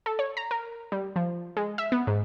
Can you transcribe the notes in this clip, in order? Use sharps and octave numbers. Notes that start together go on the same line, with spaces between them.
A4
C#5
A#5
A#4
G3
F3
G#3
E5
B3
G#2